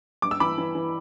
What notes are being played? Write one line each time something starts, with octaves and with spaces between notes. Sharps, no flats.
G2 D6
E6
E3 B5 D6
E3
E3